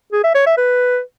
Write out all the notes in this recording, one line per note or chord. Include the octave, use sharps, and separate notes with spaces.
G#4
E5
C#5
E5
B4